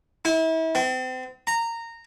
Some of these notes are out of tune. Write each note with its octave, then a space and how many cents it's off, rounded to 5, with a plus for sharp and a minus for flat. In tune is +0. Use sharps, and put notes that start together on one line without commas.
E4 -35
C4 -35
A#5 -15